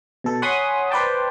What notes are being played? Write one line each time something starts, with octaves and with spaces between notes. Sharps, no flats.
B2 A4
C#5 F#5 G#5 B5 C6 D#6
B4 C5 D5 G5 A5